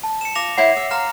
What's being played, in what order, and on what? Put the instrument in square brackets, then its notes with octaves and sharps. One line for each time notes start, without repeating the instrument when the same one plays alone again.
[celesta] A5
[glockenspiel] C#7 E7
[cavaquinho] F4 [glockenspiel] D6 A#6 F7
[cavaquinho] E4 C5 [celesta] C#5 F#5 C7
[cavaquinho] E5
[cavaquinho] F5 C6 [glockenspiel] A#5 F6